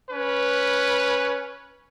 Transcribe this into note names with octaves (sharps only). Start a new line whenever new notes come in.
C#4 B4